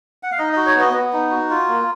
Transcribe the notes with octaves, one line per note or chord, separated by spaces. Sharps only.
F#5
F5
D#4 D#5
F#4 D#5
C#5
B3 D#5
B3
D#4
F#4
F4
A#3